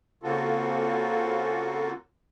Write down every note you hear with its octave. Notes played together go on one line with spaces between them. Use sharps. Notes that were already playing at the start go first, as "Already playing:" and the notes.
C#3 A#3 C4 F4 F#4 A4